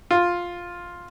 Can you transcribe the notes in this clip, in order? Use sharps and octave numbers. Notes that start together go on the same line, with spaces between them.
F4